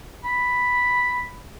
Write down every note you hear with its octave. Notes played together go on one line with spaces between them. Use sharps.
B5